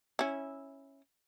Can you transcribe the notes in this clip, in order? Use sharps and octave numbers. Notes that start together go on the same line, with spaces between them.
C#4 E4